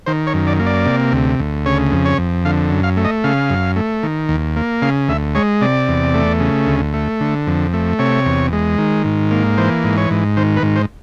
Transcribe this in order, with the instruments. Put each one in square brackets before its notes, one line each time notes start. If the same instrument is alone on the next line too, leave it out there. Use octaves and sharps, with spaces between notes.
[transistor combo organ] D#3 C5
C#5
F#2
D5
A#3
D5
C3
D2
D2
C#3 C#5
F2
C#5
F2
D3 F5
F#2
F5
A3
D#5
C#3 F5
F#2
A3
D#3
D#2
A#3
C#3 F5
D2 E5
G#3 C#5
C3 D5
E2
A3
C#3
D2
A3
D3
F2
A3
C3 C#5
E2
G#3
D#3
G#2
A#3
E3 C5
G#2
C#5
G#2
D#3 C5
B4
G#2
C5